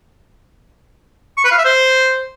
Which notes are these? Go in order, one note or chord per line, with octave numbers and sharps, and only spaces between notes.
C#6
B4
F5
E5
C5